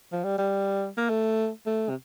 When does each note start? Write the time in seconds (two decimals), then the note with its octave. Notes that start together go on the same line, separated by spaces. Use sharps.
0.12 F3
0.24 G3
0.38 G3
0.98 A#3
1.10 A3
1.66 A3
1.89 C3